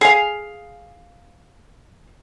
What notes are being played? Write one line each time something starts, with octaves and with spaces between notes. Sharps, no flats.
G#4 F5